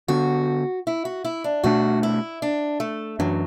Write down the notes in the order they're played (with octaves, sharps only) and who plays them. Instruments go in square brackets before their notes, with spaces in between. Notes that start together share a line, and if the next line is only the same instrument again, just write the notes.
[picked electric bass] D3 B3 D4 [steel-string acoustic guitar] F#4
[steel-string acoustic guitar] E4
F#4
E4
D4
[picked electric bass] B2 A3 D4 [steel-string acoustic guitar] F#4
[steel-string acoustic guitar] E4
D4
A3
[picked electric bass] F#2 E3 D4 [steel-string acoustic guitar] F#3